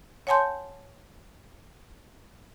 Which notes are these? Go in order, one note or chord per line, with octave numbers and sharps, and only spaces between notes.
C#5 F#5 G#5 A5 C6 G6